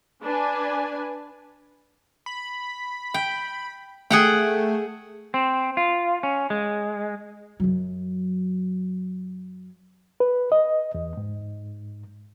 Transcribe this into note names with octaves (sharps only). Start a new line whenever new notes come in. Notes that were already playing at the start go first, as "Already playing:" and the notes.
D4 B4 G#5
B5
G5
A3 G#4 F#5 G5
C4
F4
C#4
G#3
F#2 F#3
B4
D#5
E2
G#2